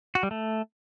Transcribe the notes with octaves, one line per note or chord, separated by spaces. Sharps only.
F#4
G3
A3